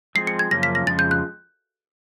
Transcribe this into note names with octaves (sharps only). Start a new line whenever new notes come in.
F3 G#3 C4 E4 G#4 C7
C#7
G#6
F#2 C#3 F3 A#3 C#4 A#6
B6
A#6
F2 C#3 F3 G#3 A6
G6
F#6